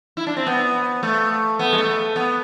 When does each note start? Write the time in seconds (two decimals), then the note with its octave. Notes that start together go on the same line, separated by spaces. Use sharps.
0.17 E4
0.27 D4
0.37 C4
0.47 B3
1.03 A3
1.59 B3
1.73 G#3
1.78 A3
2.16 B3